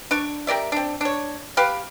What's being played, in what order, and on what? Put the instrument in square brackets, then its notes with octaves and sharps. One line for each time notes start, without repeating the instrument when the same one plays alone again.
[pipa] D4 D5 C#6
G4 A#4 D5 E5
C4 D4
D4 C#5
G4 B4 F5